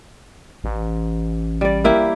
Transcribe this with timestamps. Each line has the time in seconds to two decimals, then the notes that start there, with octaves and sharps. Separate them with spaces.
0.64 A1
1.61 G3 D5
1.84 A#3 E4 G4